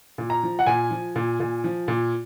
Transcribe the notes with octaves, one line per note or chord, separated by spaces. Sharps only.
A#2
A#5
F3
F#5
A#2 G#5
F3
A#2
A#2
F3
A#2